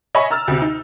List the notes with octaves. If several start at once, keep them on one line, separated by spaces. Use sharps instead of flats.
C#5 D#5 E5 G#5 B5 C#6
A#5 E6 F6 A6
D2 C3
D#4